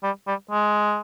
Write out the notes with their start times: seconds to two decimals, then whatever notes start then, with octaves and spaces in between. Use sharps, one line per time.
0.03 G3
0.27 G3
0.51 G#3